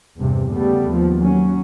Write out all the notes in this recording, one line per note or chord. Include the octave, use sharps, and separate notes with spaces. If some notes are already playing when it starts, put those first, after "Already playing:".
E2 G2 C3
C#3 G3 A3 B3
D#2 F3
F#3 C#4